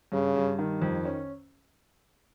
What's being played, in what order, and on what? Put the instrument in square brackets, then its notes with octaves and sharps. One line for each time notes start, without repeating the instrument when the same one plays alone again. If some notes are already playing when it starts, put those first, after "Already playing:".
[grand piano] G2 [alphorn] C#3
[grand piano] G2
D#3
F2
C#4